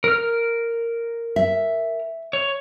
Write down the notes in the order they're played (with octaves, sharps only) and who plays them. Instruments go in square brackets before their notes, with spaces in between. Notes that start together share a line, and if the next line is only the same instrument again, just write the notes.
[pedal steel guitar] A#4 F6
[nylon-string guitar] E5
[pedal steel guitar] C#5